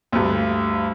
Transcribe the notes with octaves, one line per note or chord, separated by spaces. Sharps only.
D2 G2